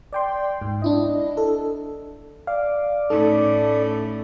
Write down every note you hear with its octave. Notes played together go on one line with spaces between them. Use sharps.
D5 G5 C6
G#2
D4 E4 D#5
A4
D5 F5
A2 A3 C#4 D#4 A4